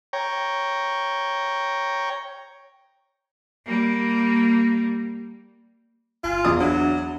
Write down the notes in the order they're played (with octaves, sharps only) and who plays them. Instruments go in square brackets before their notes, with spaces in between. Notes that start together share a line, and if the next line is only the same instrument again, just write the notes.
[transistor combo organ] C#5 G5 A#5
[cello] G3 A#3
[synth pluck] G1 G#5 F6 [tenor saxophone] F4
[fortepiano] E2 D5 D#6 [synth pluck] F#4
[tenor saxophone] F#3 [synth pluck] D4 E5